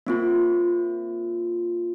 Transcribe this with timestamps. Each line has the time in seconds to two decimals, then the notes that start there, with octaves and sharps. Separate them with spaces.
0.07 A#3 C4 F4